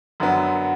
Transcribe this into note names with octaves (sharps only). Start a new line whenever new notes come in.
F#2 D3 F#3 B3